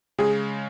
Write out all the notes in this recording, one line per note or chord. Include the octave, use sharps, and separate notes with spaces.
C#3 G#3 G#4